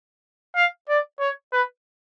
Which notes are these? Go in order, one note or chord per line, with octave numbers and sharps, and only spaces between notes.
F5
D5
C#5
B4